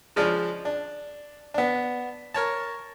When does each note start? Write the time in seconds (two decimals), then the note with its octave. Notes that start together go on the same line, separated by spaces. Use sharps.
0.16 C#3 F3 G#3 D4
0.65 D4
1.54 B3 D4
2.34 A#4 C#5 A5